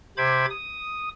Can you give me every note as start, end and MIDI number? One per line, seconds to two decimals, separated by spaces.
0.17 0.46 48
0.17 0.46 72
0.17 0.46 83
0.17 0.46 86
0.17 0.46 92
0.50 1.09 87